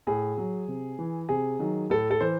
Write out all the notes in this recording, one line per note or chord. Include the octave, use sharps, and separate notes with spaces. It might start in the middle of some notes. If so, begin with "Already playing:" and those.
A2 G#4
F#3
C3
E3
C3 G#4
D#3 F#3
A2 A4
A4
E3 C5